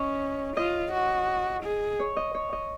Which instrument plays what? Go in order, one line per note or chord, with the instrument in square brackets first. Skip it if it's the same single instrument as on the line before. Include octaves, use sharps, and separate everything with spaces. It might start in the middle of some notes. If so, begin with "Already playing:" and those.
Already playing: [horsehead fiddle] C#4 [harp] C#5 D#5
[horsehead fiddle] F4 [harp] D#5
[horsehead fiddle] F#4
G#4
[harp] C#5
D#5
C#5
D#5